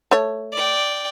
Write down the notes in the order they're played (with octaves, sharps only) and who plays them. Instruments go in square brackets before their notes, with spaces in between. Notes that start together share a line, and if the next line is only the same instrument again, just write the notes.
[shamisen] A3 C#5
[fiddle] D5 G5